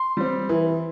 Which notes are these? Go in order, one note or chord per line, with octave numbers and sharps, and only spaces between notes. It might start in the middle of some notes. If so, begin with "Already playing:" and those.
Already playing: C6
G3 C4
E3